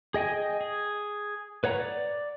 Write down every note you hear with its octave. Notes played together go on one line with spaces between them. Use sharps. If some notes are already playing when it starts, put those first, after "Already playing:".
G#4 D#5 G5 G#5
G#4
B4 C#5 F#5 A#5
D5